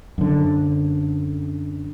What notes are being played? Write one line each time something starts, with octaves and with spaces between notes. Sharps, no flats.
F#2 D3